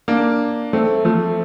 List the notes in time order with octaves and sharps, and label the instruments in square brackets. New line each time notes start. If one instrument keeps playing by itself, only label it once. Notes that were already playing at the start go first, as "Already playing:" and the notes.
[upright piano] A#3 D4
A3 C4
F3 A3